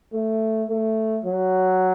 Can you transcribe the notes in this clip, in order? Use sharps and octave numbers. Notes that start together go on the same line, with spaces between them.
A3
A3
F#3